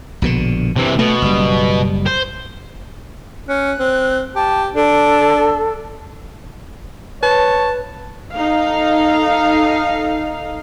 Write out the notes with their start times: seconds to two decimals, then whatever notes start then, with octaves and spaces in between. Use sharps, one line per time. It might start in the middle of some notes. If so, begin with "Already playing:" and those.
0.22 A#1 B2 D3
0.76 C3 E3
0.99 B2 A3
1.22 F#1 G3
2.06 C5
3.49 C#4 F#6
3.79 C4
4.35 G4 A5
4.75 D4 A4
7.23 B4 C#5 A5
8.33 D#4 A4 F5